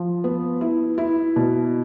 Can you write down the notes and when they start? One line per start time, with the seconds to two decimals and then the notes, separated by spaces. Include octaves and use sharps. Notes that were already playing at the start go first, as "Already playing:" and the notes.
Already playing: F3
0.24 B3
0.61 E4
0.98 E4
1.36 B2